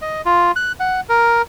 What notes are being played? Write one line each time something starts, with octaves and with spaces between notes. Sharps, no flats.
D#5
F4
F#6
F#5
A#4